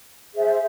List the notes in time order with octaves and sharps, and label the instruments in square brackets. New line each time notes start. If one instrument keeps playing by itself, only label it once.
[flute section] G#4 C5 E5